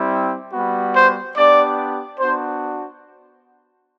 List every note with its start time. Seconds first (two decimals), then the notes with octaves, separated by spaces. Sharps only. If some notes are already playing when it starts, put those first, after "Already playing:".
Already playing: G3 C4 E4
0.52 G3 B3 F#4
0.95 C5
1.36 B3 D4 G4 D5
2.18 B3 D4 F#4 C5